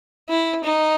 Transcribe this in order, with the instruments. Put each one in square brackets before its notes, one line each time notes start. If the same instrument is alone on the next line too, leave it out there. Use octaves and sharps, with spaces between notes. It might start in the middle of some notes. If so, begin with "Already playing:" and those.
[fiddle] E4
D#4